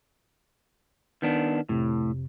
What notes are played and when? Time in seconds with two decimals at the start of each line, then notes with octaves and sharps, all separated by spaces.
1.22 D#3 B3 D4
1.69 F2 A2 C3